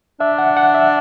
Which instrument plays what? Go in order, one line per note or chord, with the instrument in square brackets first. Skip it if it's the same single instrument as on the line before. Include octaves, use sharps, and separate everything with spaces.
[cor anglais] D4 [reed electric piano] E5
[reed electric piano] F#5
F#5
E5